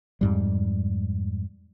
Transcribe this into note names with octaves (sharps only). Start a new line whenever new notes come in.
F2 G#2 G3